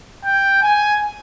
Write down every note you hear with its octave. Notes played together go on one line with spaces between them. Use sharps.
G5
G#5